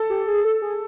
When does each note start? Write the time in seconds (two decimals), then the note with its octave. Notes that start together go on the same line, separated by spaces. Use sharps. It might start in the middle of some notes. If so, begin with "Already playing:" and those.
Already playing: A4
0.10 G4
0.28 G#4
0.45 A4
0.62 G#4